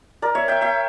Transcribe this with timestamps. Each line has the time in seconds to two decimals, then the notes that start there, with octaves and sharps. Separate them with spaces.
0.22 A#4 D5
0.35 C#5 E5
0.48 E5 G5
0.61 E5 G5